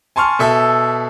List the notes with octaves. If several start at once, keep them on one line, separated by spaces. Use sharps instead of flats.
G#5 A5 C6 C#6 F6
B2 A4 E5